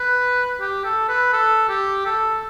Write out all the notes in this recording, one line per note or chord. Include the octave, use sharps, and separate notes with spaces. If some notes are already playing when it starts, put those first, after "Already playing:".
Already playing: B4
G4
A4
B4
A4
G4
A4